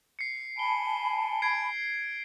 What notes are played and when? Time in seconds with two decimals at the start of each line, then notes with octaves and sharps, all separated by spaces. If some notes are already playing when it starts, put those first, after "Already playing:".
0.19 C7 C#7
0.57 G#5 A5 B5 D7 G7
1.42 G#6 C7 D7